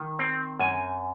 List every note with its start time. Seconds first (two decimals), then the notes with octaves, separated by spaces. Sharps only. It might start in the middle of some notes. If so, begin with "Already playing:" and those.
Already playing: D#3
0.19 C4
0.59 F#2 G#5